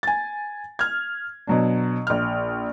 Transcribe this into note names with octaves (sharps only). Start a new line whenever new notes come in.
G#5 A6
F6 G#6
B2 F#3 D4
A#1 F6